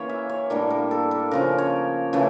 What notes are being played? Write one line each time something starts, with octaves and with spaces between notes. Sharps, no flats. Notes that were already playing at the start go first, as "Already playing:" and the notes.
Already playing: E3 A#3 C#4 C#5
E5
C#5
A2 G3 A#3 D4 A#4
A#4
A4
A#4
C#3 F3 C#4 A#4
C#5
C#3 E3 A3 C#4